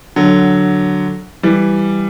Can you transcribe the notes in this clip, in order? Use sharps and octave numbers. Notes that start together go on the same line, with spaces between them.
D3 F#3
E3 G3